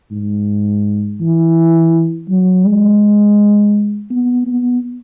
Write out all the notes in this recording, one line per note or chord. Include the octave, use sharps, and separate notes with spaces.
G#2
E3
F#3
G#3
B3
B3